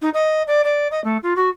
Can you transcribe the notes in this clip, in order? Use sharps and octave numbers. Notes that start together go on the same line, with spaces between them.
D#4
D#5
D5
D5
D#5
A3
F4
F#4